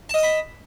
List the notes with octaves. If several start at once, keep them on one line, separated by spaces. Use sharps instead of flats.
D#5 A5 B5 D#6